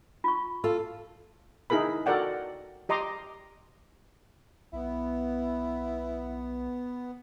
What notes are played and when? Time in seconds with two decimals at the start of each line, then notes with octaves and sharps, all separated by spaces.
0.24 F4 C#6
0.64 F4 A4
1.70 D#4 E4 G#4 A#4 B5
2.06 F#4 A4 A#4 D5 F#5 G5
2.89 G4 D#5 A#5 C6 D6
4.73 B1 B3 E4